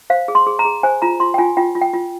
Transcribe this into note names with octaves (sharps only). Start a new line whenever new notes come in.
C5 F5
G#4
C6
G#4
A#5
G#4
C5 G#5
F4 A#5
F4 C6
G5
F4 G#5
F4 G5
F4
G5
F4